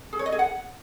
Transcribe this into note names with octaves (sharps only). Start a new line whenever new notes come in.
G#4
C#5
D#5
G#4
F#5